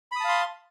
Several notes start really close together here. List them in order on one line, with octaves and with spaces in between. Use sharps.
B5 D#6 A5 F5 C6